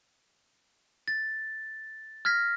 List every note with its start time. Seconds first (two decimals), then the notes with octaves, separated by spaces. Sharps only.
1.08 A6
2.25 F6 G#6 A#6 B6